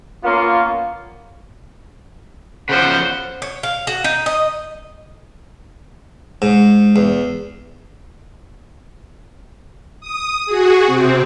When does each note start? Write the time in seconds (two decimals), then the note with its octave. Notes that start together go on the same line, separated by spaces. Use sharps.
0.24 A#3 B3 C#4 F4
2.69 C#3 F3 C5 F#5
3.42 C#5
3.63 F5
3.87 F#4
4.04 D#4
4.26 D#5
6.42 G#2
6.96 E2
10.01 D#6
10.46 F#4 G#4
10.86 C3 C4